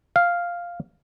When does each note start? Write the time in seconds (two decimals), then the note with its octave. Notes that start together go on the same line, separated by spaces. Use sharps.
0.16 F5